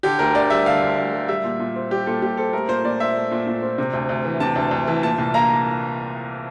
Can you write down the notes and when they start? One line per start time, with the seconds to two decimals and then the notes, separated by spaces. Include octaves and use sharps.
0.03 D3 G4
0.19 D2 A#4
0.35 D2 D5
0.50 G3 E5
0.66 D3 F5
0.82 D2
0.97 D2
1.13 G3
1.28 G3 E5
1.44 A#2
1.60 A#2
1.76 C4
1.91 G3 G4
2.06 A#2 A4
2.22 A#2 G4
2.37 C4 A4
2.53 A3 A#4
2.68 A#2 C5
2.84 A#2 D5
3.00 C4 E5
3.16 A3
3.31 A#2
3.47 A#2
3.62 C4
3.78 C3
3.93 D2
4.09 D2
4.25 E3
4.40 C3 A5
4.56 D2
4.71 D2
4.87 E3
5.03 A#2 A5
5.18 C2
5.34 A#3 A#5